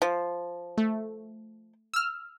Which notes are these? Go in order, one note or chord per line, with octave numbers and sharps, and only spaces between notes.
F3
A3
E6 F6